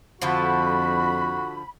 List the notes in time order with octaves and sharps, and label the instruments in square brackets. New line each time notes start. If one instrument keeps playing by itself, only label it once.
[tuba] F2 [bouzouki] D3 F3 A4 [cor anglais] F#4 [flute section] B5